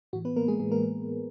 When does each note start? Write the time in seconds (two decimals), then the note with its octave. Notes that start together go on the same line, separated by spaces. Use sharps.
0.13 A2 E3 F#4
0.25 B3 B4
0.36 A#3 A#4
0.48 G#3 G#4
0.60 A2 E3 G#3 G#4
0.71 A#3 A#4